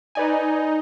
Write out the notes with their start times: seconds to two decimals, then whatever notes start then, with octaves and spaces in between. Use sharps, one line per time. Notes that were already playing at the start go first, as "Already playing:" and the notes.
0.15 D#4 B4 D5 G#5